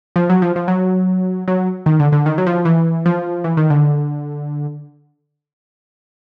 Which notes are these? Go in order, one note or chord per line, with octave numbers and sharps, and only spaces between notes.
F3
F#3
F3
F3
F#3
F#3
D#3
D3
D3
D#3
F#3
F3
E3
F3
E3
D#3
D3